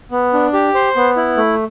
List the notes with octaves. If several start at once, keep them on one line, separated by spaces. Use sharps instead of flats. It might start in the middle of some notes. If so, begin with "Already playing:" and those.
B3
D4
G4
C5
B3
E4
A3